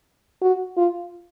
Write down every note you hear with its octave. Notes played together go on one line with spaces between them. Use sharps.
F#4
F4